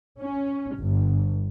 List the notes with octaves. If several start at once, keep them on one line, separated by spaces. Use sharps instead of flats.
C#4
G1